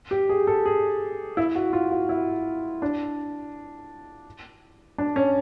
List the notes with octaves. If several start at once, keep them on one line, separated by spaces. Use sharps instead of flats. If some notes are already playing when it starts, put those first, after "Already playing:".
G4
G#4
A4
G#4
E4
F#4
F4
F#4
E4
D4
D4
C#4